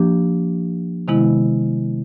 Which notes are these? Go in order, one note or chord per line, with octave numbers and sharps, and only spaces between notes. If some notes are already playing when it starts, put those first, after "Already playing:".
Already playing: F3 A#3 D4 G4
C3 D#3 G#3 B3 E4